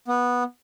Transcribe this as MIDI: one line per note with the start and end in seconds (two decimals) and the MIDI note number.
0.08 0.44 59